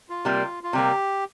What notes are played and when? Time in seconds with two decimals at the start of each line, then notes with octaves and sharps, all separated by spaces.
0.09 F4
0.25 C3 G3 A#3
0.63 F4
0.73 C3 G3 A#3 G4